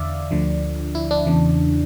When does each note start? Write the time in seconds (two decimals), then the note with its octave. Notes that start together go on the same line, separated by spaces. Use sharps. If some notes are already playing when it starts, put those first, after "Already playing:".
Already playing: E2 D3 D5 E5 F5
0.31 D2 D3 F3
0.95 E4
1.11 D4
1.27 E2 C#3 E3